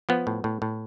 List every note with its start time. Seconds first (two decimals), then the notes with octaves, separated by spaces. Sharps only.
0.09 F3 B3
0.27 A2
0.44 A2
0.62 A2